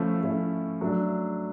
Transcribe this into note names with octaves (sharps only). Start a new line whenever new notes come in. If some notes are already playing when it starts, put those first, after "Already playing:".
Already playing: F3 A3 C#4 E4
F3 A3 C#4 E4
F#3 A3 D4